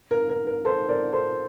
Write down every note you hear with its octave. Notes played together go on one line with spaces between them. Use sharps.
A#4
A#4
A#4
A4 C5
A#4 D5
A4 C5